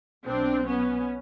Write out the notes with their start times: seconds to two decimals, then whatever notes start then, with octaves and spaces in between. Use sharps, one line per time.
0.25 B1 B2 F#3 C4 D4
0.67 B3 C#4